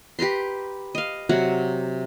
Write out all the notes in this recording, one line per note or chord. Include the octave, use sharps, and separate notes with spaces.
G4 B4 A#5 C6
D#5 F5
C3 F#3 F#5 A#5